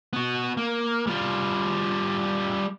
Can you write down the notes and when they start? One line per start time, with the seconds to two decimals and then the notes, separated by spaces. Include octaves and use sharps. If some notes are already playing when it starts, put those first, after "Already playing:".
0.13 B3 F#4
0.57 A#3
1.07 G3 F4